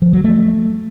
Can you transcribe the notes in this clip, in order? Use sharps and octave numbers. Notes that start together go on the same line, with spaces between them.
F3
F#3
A3